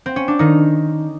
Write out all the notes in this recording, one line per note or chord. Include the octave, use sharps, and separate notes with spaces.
C4
C#4
D4
D#3 D#4